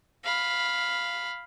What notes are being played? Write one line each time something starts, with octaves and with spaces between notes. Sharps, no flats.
F5 B5